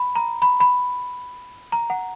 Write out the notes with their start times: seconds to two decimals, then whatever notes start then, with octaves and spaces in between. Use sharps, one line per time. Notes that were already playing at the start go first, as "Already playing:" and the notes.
Already playing: B5
0.15 A#5
0.42 B5
0.60 B5
1.72 A#5
1.90 F#5